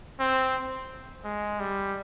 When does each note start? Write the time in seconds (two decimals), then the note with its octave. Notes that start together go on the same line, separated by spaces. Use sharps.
0.20 C4
1.24 G#3
1.60 G3